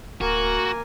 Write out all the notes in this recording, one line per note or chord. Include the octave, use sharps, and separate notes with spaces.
D1 A#3 F#4 A#4 G#5